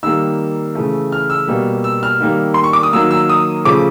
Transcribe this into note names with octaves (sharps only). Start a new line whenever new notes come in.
D#3 G3 A#3 E6
C#3 E3 A3
F6
E6
B2 G3 A#3
E6
F6
D#3 G3 A#3
C6
C#6
D6
D#6
D#3 F#3 A#3 E6
E6
D#6
C#3 F3 A3 D6